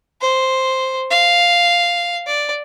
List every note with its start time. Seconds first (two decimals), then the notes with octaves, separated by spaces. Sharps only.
0.21 C5
1.11 F5
2.27 D5